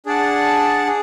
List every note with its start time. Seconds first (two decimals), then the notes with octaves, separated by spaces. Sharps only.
0.06 D4 G#4 D5 F#5 A5
0.87 G#4